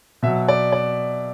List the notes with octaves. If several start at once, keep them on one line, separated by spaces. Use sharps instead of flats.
B2 F#3 E5
D5
D5